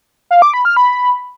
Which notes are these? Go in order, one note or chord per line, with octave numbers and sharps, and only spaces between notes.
F5
D6
B5
F6
B5